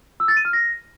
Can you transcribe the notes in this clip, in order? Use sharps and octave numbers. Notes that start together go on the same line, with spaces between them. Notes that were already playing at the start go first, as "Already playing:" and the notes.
E6
A6
D#7
F6
A#6